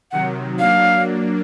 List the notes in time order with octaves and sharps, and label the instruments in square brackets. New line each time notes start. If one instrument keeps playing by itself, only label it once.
[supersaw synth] C3 D#3 F#3 [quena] F#5
[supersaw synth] F#3 A#3 D4 [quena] F5